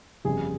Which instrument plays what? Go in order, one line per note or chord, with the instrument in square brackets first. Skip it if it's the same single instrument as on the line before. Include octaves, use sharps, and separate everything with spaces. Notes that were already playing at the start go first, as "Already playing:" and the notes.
[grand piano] G1 F2 C#3 G3 G#4